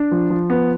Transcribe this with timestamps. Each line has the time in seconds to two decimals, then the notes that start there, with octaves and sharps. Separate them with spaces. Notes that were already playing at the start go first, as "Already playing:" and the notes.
Already playing: D4
0.11 F3
0.30 F3
0.50 B3